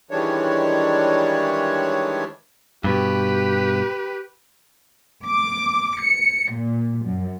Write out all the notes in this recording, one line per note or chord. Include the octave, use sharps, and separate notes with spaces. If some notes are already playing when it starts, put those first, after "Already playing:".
D#3 E3 G3 G#3 D4 C#5
G2 B2 G4 B4
D6
C#7
A#2
F#2